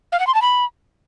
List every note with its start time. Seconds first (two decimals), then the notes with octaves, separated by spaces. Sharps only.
0.12 F5
0.20 F#5
0.27 C6
0.34 A5
0.42 B5